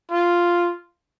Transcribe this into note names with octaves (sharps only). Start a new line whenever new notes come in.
F4